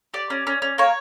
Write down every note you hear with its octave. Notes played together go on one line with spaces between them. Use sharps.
G4 D5
C#4
C#4
C#4
A#3 C#5